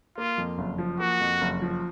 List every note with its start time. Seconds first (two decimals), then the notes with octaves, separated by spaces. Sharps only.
0.17 A#3 F4
0.38 F2
0.58 F#1
0.78 F3
1.00 A#3 F#4
1.20 F2
1.41 F#1
1.62 F3